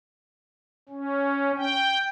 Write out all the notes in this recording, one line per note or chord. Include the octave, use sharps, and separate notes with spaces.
C#4
G5